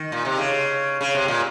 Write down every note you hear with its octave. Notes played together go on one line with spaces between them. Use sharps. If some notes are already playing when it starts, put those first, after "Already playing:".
Already playing: D#3
A#2
C3
C#3
C#3
C3
A#2